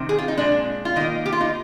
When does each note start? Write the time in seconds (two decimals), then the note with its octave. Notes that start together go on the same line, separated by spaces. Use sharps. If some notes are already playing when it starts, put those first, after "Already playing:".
Already playing: C3 D#3 C4
0.09 G#4
0.18 F4
0.28 D#4
0.38 A#2 G#3 C4 D4
0.85 F4
0.96 D#3 D#4
1.01 A#3
1.26 G4
1.32 F4
1.41 D#4